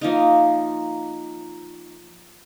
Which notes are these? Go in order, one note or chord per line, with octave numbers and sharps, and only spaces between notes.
F3 A#3 D#4